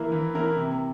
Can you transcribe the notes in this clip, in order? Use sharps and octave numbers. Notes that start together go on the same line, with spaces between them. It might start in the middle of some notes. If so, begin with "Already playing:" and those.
Already playing: E3 A#3 E4 A#4
E3
A#3 E4 A#4
C3